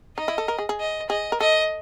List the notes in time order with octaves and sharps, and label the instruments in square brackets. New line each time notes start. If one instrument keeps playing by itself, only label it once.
[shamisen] D#4 [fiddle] D#5
[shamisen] E4
A4
A#4
G#4
G#4
[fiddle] D#5
[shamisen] G#4 [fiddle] D#5
[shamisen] A#4
[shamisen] A4 [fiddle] D#5